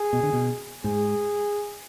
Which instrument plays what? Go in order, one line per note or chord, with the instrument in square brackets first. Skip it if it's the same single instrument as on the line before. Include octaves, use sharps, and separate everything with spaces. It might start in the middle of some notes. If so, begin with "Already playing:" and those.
Already playing: [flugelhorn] G#4
[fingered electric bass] B2
D3
B2
[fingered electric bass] G#2 [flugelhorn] G#4